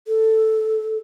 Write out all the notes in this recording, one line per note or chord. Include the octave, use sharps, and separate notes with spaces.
A4